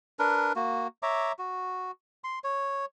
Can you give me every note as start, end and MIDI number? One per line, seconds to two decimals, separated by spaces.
0.19 0.52 62
0.19 0.52 70
0.19 0.52 71
0.56 0.87 58
0.56 0.87 66
1.03 1.32 73
1.03 1.32 76
1.03 1.32 82
1.03 1.32 86
1.39 1.91 66
2.24 2.39 84
2.44 2.85 73